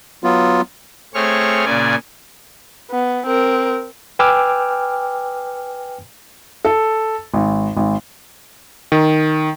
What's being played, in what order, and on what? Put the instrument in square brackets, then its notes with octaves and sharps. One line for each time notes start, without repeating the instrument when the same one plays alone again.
[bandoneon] F#3 B3 F4
[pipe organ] A3 C4 G#4 C#5 C#6 F6
A#2 C#3 D5 G#5
[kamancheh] B3
C4 A#4
[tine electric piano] B4 G5 G#5 D6 E6 F6
[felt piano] A4
G#1
G#1
[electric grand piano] D#3